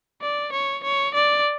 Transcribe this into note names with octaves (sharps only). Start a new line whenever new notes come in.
D5
C#5
C#5
D5